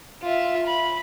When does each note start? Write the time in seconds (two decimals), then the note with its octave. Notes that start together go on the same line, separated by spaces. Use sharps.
0.22 F4 E5
0.66 B5